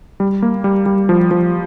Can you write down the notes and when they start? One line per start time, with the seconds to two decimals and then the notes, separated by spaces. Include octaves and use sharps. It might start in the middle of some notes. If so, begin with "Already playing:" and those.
0.20 G3
0.42 A#3
0.64 G3
0.86 G3
1.09 F3
1.31 F3